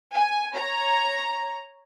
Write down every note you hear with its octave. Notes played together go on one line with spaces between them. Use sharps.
G#5
C#5 A#5